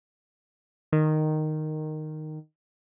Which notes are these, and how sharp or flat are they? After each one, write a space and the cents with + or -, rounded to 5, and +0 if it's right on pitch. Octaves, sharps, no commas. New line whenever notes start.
D#3 -10